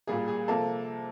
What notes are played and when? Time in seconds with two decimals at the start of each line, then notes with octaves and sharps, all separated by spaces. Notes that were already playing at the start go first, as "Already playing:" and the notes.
0.07 A#2 G3 A#3 G#4
0.28 G#4
0.48 C3 F3 A#3 A4